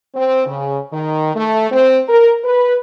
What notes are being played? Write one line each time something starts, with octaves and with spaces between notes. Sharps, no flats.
C4
C#3
D#3
A3
C4
A#4
B4